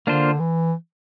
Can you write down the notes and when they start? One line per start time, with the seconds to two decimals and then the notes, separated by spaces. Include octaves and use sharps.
0.07 D3 A#3 D4 F4 C5
0.40 E3